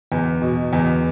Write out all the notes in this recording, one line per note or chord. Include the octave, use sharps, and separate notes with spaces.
E2
B2
E2